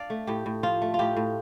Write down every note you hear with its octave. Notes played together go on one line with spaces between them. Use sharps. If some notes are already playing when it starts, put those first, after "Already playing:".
Already playing: D4 D5 F5
A3
A2 G4
A2
F3 F4
A3
F4
A2 G4
A2